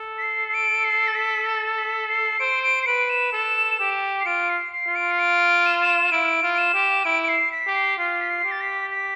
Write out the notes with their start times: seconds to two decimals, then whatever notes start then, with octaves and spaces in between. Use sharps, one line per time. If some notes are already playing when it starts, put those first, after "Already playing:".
Already playing: A4
0.18 B6
0.22 C7
0.48 C7
0.54 D7
0.84 C7
1.07 A6
1.15 B6
1.46 A6
1.78 B6
2.08 C7
2.40 C5 D7
2.63 D7
2.82 C7
2.86 B4 D7
3.09 E7
3.32 A4
3.79 G4
4.21 C7
4.25 F4 D7
4.49 C7
4.72 C7
4.88 F4
4.95 D7
5.12 C7
5.19 D7
5.66 E7
5.82 E7
6.12 E4 D7
6.43 F4
6.54 D7
6.58 E7
6.74 G4
7.05 E4 D7
7.23 D7
7.29 C7
7.52 B6
7.67 G4
7.75 C7
7.98 F4 C7
8.21 B6
8.29 C7
8.45 G4
8.51 A6
8.61 B6
8.91 B6